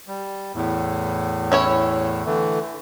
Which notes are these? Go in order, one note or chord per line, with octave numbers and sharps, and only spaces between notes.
G3
E2 A2
C#4 E4 C#5
D3 E3 A3